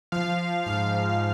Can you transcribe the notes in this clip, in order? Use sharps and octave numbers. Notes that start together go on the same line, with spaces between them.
F3 F5
F3
G#2 F5
G#2